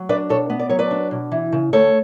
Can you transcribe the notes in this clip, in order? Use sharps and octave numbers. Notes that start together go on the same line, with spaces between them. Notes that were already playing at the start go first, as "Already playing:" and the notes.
Already playing: F#3
D4 B4 D5
B2 A4 C#5
B3
D5
F#3 C#5
B4 D5
D4
B2
E3
C#3
D2 A4 C#5